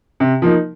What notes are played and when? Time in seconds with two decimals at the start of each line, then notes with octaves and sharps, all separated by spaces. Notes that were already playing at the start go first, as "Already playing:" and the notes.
0.20 C3
0.42 F3 A#3 D#4